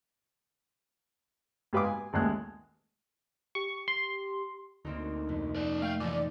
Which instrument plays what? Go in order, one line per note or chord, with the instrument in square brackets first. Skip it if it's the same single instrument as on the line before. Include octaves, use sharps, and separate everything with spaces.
[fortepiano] G#2 G4 B4 F5 C6 D6
G#5
A1 D#2 G#3 F#6
[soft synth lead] G4 [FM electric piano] C#6
[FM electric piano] C6
[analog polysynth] D2 [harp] A#3 C4 D#4
[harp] F2 C3
[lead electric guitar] D#4 D5
[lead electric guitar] A3 [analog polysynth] F5 G5
[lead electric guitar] A2 E3 [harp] F3 D#4 [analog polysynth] D5